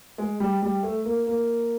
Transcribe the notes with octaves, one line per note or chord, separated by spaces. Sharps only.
G#3
G3
G3
A3
A#3
A#3